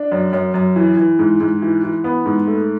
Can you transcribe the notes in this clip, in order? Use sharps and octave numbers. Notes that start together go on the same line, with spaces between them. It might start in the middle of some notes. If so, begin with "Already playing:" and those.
Already playing: D4
F#2
F#2
F#2
E3
E3
G#2
G#2
E3
E3
B3
G#2
A3